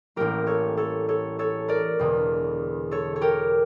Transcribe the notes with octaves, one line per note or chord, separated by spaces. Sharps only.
A1 A2 G3 A#3 G4 A#4
A4 C#5
A4 C#5
A4 C#5
A4 C#5
A#4 D5
E1 E2 D3
A4 C#5
C#5
G4 A#4